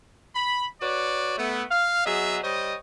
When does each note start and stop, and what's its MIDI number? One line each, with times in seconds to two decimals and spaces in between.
0.35 0.65 83
0.82 1.35 66
0.82 1.35 71
0.82 1.35 73
0.82 1.35 74
1.38 1.63 57
1.38 1.63 59
1.71 2.04 77
2.06 2.39 54
2.06 2.39 59
2.06 2.39 68
2.06 2.39 75
2.06 2.39 76
2.43 2.75 55
2.43 2.75 72
2.43 2.75 73
2.43 2.75 75